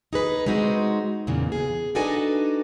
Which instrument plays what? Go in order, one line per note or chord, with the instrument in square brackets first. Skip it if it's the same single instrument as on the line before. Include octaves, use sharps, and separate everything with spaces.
[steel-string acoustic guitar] D#4 G#4 B4
G#3 C4 D#4 F#4
E2 A#2 C#3 E3
G#4
D4 D#4 F#4 A4 B4 G#5